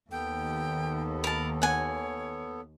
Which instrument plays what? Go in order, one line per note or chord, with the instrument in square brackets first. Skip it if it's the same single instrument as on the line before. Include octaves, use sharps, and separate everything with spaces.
[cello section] D#2 [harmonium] B3 A4 [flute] G5
[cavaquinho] A#4 A5 [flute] B5
[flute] C#5 [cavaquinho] F#5 G#5